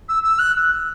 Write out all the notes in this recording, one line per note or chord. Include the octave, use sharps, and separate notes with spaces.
E6
E6
F#6